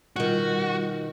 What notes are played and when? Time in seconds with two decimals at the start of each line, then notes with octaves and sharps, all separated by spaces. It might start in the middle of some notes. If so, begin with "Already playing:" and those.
0.16 B2 D#3 G3 F4 F#4